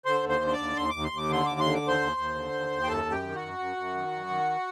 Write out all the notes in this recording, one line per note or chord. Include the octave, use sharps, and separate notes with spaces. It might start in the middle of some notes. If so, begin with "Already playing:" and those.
D3 C5 C6
D#2
C5 C6
D3
C6
D5 D6
D#2
D#2 C6
D#2 D6
C6
D#2
D6
D3 C6
D#2 D6
D3 C6
D6
D#2
C5 C6
D#2
D#2
D3
D#2
D#2
G5
F#2 A4 A5
F#2
G4 G5
D#3
F#4 F#5
F#2
F#2
F#2
D#3
F#2
D#3